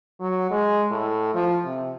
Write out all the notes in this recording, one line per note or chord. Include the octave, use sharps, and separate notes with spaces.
F#3
G#3
A2
F3
C3